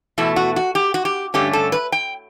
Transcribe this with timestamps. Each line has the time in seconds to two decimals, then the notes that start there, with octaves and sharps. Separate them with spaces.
0.18 E2 B2 A3 E4
0.36 F#4
0.56 F#4
0.75 G4
0.94 F#4
1.05 G4
1.34 G2 D3 A3 C#4 G4
1.53 A4
1.72 B4
1.92 G5